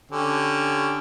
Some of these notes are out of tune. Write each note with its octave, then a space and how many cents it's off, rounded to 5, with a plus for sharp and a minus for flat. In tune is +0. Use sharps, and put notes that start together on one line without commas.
D3 +0 C#4 +0 G4 +0